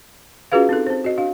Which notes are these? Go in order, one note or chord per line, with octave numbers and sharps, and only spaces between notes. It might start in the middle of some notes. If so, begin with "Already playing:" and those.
C#4 F4 F#4 G#4 B4 F5
C4 D#4 A4
C4 C5
F#4 D#5
D4 F#4 F5